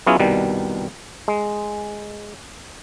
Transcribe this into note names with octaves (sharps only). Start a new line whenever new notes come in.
F#3 B3 C#4 E4 F4 G#4
C2 B2 D#3 G3
G#3